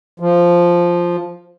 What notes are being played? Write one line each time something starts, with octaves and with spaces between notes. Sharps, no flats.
F3